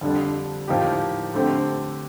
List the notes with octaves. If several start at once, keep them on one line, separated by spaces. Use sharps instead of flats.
F2 D3 G3 D4 A4
A2 F3 A#3 D#4 G4
D3 A3 C4 G4